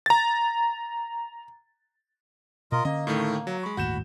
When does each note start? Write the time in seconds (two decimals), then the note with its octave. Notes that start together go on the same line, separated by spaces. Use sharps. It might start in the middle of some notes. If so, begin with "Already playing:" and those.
0.06 A#5 A6
2.72 B2 F4 A#4 D#5
2.85 D3 A#3 C#4 D#5
3.07 A2 D#3 A3
3.47 F#3
3.63 G#3 B5 C#6
3.77 G1 D#2 A2 F#4 G6 E7